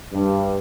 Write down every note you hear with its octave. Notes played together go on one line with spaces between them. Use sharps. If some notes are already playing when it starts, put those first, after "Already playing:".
G2